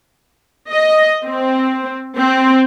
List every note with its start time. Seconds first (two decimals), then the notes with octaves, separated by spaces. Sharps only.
0.70 D#5
1.25 C4
2.17 C4